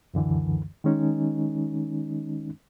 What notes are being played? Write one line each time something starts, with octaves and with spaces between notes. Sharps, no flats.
C#2 F#2 D3 E3
D#3 G#3 C#4 D#4